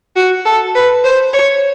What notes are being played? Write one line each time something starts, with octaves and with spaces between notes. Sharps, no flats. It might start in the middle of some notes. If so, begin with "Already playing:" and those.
F#4
A4
B4
C5
C#5